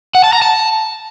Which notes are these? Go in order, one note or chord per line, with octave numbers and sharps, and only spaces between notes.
F#5
A5
A#5
A5